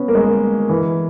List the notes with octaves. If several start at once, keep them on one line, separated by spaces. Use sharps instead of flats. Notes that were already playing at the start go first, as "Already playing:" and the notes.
Already playing: B3 C#4
A#3
G#3
E3